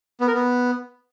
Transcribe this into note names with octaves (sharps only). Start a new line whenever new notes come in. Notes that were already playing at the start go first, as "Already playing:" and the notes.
B3
A#4
B3